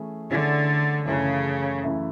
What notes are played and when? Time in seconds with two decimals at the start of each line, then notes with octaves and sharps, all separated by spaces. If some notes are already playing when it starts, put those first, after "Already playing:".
Already playing: E3 A3 C#4 E4 G#4
0.30 D3 E3 A3 C#4 E4 G#4
1.06 F#2 C#3 E3 A3 E4 A4
1.83 F#2 E3 A3 E4 A4